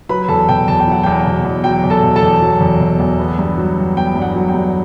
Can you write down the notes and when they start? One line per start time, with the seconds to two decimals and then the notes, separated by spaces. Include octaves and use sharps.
0.09 F#3 B4 B5
0.28 E2 A4 A5
0.49 B2 G5
0.68 E2 A5
0.80 G5
0.87 F#3 F#5
1.03 E2 G5
1.26 B2
1.45 E2
1.64 F#3 G5
1.83 E2
1.90 A4 A5
2.03 B2
2.16 A4 A5
2.22 E2
2.42 F#3
2.61 E2
2.80 B2
3.00 E2
3.19 B3
3.38 G2
3.58 F#3
3.78 G2
3.97 B3 G5
4.16 G2
4.22 F#5
4.36 F#3
4.48 G5
4.54 G2